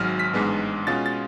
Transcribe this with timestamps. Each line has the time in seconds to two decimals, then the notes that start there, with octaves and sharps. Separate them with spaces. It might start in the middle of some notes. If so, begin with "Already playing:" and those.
Already playing: G#1 G#2 F#3 F6
0.20 B6
0.33 A1 G#2 G#3 B3 D4
0.87 B2 G#3 C#4 F4 A6
1.06 A6